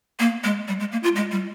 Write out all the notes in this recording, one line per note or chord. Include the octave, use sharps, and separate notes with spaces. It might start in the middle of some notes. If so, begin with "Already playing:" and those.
A#3
G#3
G3
G#3
A#3
F4
G#3
G3